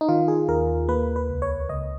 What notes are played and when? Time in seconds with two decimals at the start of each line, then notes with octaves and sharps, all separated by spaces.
0.01 D#4
0.08 D#3 F4
0.28 G#4
0.49 D#2 A#4
0.88 A#3 B4
1.16 B4
1.29 C#2
1.42 C#5
1.69 C#2 D#5